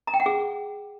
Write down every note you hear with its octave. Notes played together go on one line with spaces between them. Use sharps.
A#5
G5
F#5
G#4